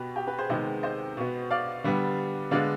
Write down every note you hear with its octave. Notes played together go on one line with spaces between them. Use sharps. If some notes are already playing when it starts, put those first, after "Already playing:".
Already playing: B2 B3 G4 B4
G4
G4 B4
G#4 C5
C3 D#3 G#3 B3 C5 D#5
C5 D#5
B2 B3
D5 F5
D3 G3 B3
D3 G#3 B3 D5 F5